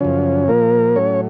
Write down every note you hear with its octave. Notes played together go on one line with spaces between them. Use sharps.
F#2 C#3 F3 C#4
A#2 F3 A#3 A#4
A2 F#3 C#4 C#5